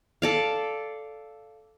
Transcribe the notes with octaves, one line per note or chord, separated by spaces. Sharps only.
A4 D5 F5